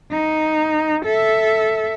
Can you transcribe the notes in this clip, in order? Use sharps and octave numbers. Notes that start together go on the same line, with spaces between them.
D#4
A4 E5